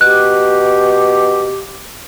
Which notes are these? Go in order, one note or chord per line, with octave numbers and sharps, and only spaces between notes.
B2 G4 F#6